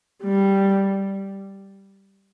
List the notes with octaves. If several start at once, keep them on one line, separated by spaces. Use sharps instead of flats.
G3